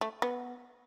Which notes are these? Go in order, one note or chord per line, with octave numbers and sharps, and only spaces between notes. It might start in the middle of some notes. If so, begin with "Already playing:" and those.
A3
B3